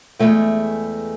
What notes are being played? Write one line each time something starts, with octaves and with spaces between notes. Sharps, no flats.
E2 G#3 A3 G5